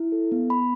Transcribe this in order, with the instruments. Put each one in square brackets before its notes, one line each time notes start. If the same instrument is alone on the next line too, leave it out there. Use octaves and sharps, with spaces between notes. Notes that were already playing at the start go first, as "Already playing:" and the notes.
Already playing: [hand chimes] E4
A4
B3
B3 B5